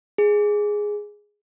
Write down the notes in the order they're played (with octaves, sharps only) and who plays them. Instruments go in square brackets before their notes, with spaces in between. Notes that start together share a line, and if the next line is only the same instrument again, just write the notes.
[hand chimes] G#4